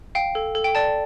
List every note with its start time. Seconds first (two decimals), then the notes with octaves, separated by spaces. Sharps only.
0.15 F5 G5
0.35 A4
0.55 A4
0.64 G5
0.75 D5 A5